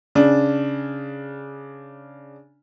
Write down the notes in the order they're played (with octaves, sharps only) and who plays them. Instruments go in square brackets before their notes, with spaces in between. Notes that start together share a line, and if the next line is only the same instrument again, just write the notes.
[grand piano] C#3 D4